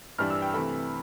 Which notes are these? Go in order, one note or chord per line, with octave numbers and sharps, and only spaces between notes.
G2 E3 G3 D4 F6
E6
G5
C3 E3 A3 B5